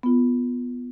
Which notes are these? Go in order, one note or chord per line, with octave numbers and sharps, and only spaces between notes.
B3 F4